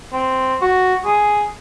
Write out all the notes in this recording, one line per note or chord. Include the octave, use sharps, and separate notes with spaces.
C4
F#4
G#4